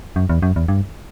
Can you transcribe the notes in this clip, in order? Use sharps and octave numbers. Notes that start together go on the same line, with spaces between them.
F#2
E2
F#2
E2
G2